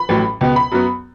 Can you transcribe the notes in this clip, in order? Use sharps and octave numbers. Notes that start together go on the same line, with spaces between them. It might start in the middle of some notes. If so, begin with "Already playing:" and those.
Already playing: B5
A1 A2 F#3
C#2 B2 B3
B5
F#2 F#3 B3